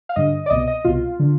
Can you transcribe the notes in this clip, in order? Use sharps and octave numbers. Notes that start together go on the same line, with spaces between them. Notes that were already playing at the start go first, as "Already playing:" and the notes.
F5
G2 D3 D#5
D5
C2 B2 D#5
D#5
C2 B2 F4
D3